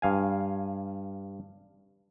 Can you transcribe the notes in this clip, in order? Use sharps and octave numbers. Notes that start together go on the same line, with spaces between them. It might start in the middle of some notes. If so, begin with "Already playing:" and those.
G2 F5 G#5